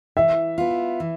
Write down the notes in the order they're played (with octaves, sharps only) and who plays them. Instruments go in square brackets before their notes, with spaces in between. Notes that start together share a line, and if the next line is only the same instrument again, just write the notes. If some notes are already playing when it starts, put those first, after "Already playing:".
[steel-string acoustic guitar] E3 [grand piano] E5
[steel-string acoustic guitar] B3 F4
E3